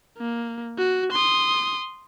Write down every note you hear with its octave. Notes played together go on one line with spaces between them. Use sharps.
A#3
F#4
C6 D#6